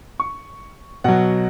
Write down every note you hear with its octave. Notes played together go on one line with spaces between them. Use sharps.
C#6
B2 F#3 F#5